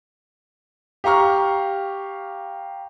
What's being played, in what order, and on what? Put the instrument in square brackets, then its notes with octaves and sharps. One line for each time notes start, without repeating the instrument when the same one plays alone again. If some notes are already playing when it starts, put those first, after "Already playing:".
[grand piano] G4 F5 A#5 C#6 F6